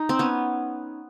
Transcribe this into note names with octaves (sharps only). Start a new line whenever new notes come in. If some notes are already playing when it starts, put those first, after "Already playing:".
Already playing: D#4
C4
B3 C#4